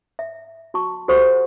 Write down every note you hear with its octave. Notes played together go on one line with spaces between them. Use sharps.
E5
F#4 A5 C#6
F#4 G4 A4 C5 F#5 C#6